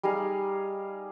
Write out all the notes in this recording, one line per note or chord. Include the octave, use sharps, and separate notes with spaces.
G3 D#4 G#4 F5